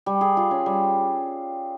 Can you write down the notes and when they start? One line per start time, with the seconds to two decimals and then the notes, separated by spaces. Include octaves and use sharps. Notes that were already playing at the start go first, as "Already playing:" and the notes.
0.06 G3
0.21 G#4
0.37 F4
0.51 C#4
0.66 G3